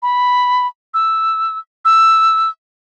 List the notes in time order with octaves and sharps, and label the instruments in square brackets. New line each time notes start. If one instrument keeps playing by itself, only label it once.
[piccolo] B5
E6
E6